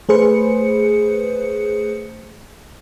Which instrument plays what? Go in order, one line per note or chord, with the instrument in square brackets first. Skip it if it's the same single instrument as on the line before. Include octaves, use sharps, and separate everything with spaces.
[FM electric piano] A3 G#4 B4 C5 C#7